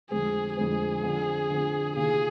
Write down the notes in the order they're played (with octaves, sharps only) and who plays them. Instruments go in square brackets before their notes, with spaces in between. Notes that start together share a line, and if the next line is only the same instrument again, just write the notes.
[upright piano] F2 D3 G#3 C4 [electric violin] G#4
[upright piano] F2 D3 G#3 C4 [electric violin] G#4
[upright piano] D3 F3 C4
D3 F3 C4
[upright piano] C3 D#3 A#3 F4 [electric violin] G#4